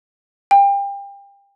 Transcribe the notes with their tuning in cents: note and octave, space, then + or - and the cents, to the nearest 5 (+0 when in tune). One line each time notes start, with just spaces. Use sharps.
G5 +30